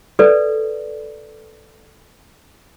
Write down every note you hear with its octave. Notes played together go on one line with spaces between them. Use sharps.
A4 B4 D5 E5